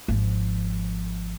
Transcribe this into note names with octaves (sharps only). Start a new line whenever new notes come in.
G#1 F3